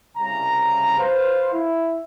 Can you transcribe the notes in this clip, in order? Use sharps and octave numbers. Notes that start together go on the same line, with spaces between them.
C2 C#3 G3 A#5
B4 C5 F5
E4